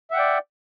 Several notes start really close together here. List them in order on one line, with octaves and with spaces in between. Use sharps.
E5 F#5 G5 D5